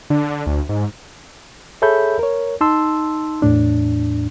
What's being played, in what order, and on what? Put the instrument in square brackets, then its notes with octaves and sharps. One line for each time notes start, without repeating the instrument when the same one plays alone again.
[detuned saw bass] D3
D3
D2
G#2
[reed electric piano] G#4 A4 C#5 E5 B5 G6
A#4 C#5
D#4 A5 C6 E6
E2 A2 D4